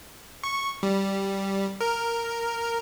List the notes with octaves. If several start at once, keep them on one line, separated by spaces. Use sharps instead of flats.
C#6
G3
A#4